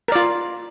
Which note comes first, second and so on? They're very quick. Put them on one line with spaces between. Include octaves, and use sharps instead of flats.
A#4 D5 F4